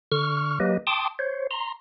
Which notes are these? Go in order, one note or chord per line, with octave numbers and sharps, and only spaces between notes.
D3 C#6 F6
F#3 A#3 G4 B4 D#5
G5 A5 C6 D6 D#6
C5 C#5
A#5 C6